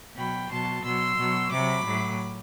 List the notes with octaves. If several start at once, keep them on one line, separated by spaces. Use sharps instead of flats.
B2 F#3 G5 B5
B2 F#3 A5 C6
B2 F#3 C6 E6
B2 F#3
C3 F#3 B5 D6
A2 F#3